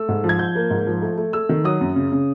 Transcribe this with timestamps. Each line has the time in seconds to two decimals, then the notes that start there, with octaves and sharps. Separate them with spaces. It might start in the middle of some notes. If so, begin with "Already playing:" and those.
Already playing: A3 E6
0.08 G#2
0.24 F3
0.29 G#6
0.39 F3 G6
0.55 A#3
0.70 G#2
0.87 F3
1.02 A3
1.18 A3
1.33 A3 E6
1.49 D#3
1.64 F#3 D#6
1.81 F#2
1.96 C#3
2.12 C#3